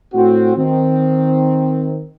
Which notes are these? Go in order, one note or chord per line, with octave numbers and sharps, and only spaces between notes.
A2 C4 F#4
D#3 C4